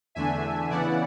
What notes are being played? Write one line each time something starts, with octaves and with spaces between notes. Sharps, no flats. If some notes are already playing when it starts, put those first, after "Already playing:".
E2 D3 A3 D4 E5 G#5
C#3 E3 B3 E4 D5 F#5